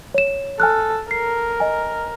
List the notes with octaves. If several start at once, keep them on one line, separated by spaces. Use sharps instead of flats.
C#5 E7
A4 G#5 F6 F#6
A#4 C7
D#5 G#5